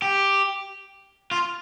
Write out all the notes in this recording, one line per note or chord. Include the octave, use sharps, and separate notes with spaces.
G4
F4